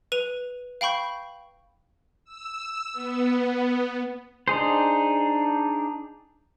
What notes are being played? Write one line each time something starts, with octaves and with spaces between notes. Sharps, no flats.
B4 D#7 F7
F5 G5 B5 C#6 G6
E6
B3
D4 D#4 G#4 C5